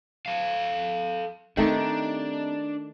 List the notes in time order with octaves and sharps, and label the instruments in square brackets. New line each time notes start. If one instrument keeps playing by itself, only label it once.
[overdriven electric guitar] A4 F5
[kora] D#3 A3 G5 [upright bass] C4 [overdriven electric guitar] D4 [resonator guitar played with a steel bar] D#4 G4